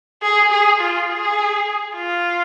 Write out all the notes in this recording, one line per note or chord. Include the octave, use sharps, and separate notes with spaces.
G#4
G#4
F4
G#4
F4